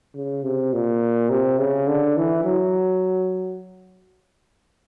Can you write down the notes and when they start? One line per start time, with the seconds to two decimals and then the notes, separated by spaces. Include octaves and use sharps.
0.15 C#3
0.43 C3
0.73 A#2
1.30 C3
1.59 C#3
1.88 D3
2.17 E3
2.45 F#3